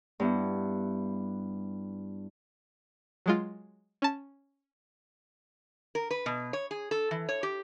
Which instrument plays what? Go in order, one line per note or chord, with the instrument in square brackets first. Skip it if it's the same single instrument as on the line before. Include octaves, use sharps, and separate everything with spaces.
[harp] G2 B3 E4
[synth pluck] F#3 G#3 F4
C#4 A5
[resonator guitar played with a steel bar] A#4
B4
B2
C#5
G#4
A4
E3
C#5
G4